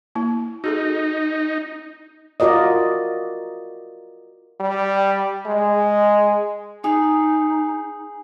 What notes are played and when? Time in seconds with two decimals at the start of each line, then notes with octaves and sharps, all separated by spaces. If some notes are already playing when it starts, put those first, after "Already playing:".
0.15 A#3 E4
0.64 D#4 F#4 G#4 A4
2.40 F4 F#4 A#4 D5 D#5
4.60 G3
5.46 G#3
6.84 D#4 G#4